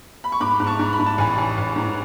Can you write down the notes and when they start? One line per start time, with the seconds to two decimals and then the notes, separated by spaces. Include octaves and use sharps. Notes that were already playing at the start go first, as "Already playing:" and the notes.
0.24 B5
0.32 C#6
0.40 G#2 B5 D6
0.60 G#2
0.66 A5 C#6
0.79 G#2
0.93 B5
0.99 G#2
1.06 A5
1.18 A1 G#5 B5
1.38 A1
1.57 A1
1.76 G#2